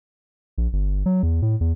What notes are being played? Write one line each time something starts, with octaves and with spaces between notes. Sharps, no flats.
A#1
G1
F#3
E2
A2
E2